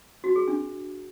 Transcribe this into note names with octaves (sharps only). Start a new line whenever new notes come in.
F#4
G#4
D4